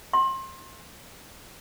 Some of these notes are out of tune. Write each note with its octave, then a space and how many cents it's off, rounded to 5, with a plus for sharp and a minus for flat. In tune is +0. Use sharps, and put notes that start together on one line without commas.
C6 +30